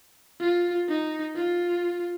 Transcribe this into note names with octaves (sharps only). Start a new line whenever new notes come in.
F4
D#4
F4